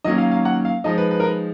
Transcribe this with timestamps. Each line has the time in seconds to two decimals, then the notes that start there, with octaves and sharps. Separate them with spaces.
0.04 D#3 F#3 A#3 C#4 D#5
0.18 F5
0.31 F5
0.45 F#5
0.65 F5
0.84 F3 G#3 D#4 D#5
0.98 B4
1.11 B4
1.20 A#4
1.24 B4